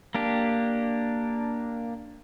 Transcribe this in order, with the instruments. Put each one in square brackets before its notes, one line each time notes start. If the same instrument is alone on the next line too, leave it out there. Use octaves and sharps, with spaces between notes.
[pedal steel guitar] A#3 D4 G4